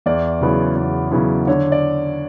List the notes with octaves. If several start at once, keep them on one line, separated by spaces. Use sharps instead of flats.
E2 D5
C#3 F#3 B3 E4
E2
C#3 F#3 B3 E4
D3 C#5
D5